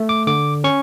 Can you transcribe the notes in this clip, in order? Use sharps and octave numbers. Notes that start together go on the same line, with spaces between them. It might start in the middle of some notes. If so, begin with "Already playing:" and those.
Already playing: A3
D6
D3 D6
C#4 C#6